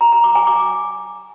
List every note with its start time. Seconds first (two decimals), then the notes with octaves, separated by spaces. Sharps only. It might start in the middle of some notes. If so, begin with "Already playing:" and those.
0.01 A#5
0.12 A#5
0.24 D6
0.35 G#5
0.47 D6